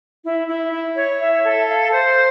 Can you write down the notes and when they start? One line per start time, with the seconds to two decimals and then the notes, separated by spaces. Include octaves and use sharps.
0.24 E4
0.48 E4
0.72 E4
0.96 C#5
1.20 E5
1.44 A4
1.68 F5
1.92 C5